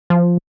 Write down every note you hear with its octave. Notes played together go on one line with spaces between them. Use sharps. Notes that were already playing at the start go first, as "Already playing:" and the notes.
F3